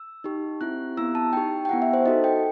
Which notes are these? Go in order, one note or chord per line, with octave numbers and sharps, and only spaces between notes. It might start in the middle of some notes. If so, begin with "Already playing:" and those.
Already playing: E6
D#4 G4
C4 E4 G4 F#6
B3 E4 G4 E6
A5
D#4 G4 G5
G5
B3 E4 G4 F#5
E5
C5
D#4 F#4 A4 D#5
G5